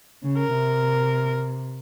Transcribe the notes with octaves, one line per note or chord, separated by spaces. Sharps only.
C#3
A#4
C3